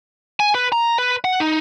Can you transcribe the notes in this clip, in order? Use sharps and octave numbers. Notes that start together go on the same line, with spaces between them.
G#5
B4
A#5
B4
F#5
D#4